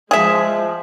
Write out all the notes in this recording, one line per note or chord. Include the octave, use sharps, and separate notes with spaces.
F3 G#3 G#4 E5